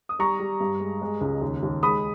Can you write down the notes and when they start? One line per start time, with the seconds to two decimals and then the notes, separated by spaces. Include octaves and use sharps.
0.09 D#6
0.19 G3 A#5 C#6
0.40 G3
0.60 G2
0.80 G#3
1.02 G#3
1.21 C#2
1.41 D#2
1.63 D#2
1.83 G#3 B5 D#6